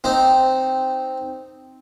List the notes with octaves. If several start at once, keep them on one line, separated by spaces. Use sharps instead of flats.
C4 D#4